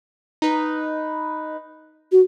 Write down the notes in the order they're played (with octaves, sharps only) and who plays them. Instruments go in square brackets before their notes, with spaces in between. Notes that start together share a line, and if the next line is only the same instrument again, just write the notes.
[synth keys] D#4 B4
[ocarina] F#4